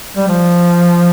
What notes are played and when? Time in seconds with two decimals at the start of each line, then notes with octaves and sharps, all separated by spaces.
0.17 G3
0.28 F3